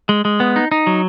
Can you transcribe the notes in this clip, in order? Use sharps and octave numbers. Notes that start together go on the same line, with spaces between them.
G#3
G#3
B3
D#4
D#4
F#3